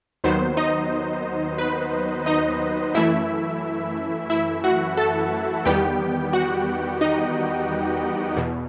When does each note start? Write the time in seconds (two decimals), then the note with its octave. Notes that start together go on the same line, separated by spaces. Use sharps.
0.24 D#2 D#3 F#3 B3 C5
0.57 D#4 D#5
1.58 B4
2.26 D#4 D#5
2.94 F#2 E3 A3 E4 E5
4.30 E4 E5
4.64 F#4 F#5
4.97 A4 A5
5.65 E2 D#3 G3 B3 G4 G5
6.33 F#4 F#5
7.01 D#4 D#5
8.37 E2 B2